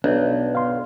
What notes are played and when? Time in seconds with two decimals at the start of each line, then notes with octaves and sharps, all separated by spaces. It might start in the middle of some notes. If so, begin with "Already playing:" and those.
0.04 B1 B3 D4 D5
0.55 F5 C6